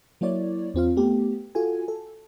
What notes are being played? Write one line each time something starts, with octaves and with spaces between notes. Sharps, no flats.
F#3 A#3 E4 C#5 D5
E2 C4 F4 F5
A3 B3 G4
F4 F#4 A4 G#5
A4